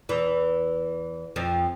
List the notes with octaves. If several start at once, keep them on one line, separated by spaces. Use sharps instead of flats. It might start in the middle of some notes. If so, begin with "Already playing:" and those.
E2 E3
F2 F3